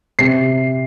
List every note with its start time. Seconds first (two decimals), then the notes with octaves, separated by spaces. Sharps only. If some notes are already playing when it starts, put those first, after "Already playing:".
0.19 C3 C7